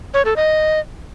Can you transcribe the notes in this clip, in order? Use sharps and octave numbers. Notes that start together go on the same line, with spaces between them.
C#5
A4
D#5